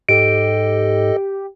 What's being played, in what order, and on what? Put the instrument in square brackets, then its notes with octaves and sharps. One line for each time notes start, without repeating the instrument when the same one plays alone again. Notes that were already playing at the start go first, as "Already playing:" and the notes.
[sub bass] G#2 [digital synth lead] G4 [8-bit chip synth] A4 D#5 [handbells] D7